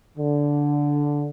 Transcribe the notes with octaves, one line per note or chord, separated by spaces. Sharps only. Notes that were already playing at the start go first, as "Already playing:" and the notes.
D3